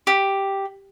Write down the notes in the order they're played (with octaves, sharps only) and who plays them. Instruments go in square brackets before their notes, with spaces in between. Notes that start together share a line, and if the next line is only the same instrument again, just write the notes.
[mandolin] G4